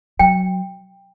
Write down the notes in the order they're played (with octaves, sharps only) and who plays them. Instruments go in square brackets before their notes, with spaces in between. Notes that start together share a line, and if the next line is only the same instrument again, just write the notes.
[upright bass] F#3 [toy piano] G5